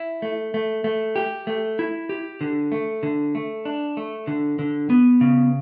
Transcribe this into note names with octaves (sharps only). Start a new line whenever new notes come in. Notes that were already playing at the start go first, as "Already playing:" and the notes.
Already playing: E4
A3
A3
A3
G4
A3
E4
G4
D3
A3
D3
A3
D4
A3
D3
D3
B3
C#3